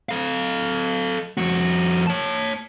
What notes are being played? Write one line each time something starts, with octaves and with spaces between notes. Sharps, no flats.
A4 F5
F2 F#4
C#5 A5